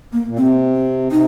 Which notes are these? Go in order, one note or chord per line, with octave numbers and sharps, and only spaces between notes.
A#3
A#2
C3 C4
C4
C3 D#4